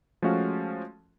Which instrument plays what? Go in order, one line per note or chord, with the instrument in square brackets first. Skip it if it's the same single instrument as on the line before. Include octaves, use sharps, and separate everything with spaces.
[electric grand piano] F3 G#3 A3 C#4 F#4 F5